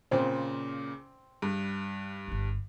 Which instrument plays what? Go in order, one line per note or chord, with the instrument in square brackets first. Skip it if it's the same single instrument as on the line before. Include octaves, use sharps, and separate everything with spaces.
[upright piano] A#2 C#3 [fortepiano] C4
[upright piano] G2
[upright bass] G1 E4